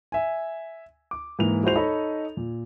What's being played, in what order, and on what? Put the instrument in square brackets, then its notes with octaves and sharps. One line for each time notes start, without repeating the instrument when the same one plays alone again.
[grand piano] E5 G#5
D6
G#2 E3 A#3 F7
G#3 E4 F#4 C5 F7
D#4 A4 C#5 D#5 B5
A#2